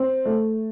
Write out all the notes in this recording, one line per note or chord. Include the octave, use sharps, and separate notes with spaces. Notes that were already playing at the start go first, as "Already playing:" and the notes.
Already playing: C4
A3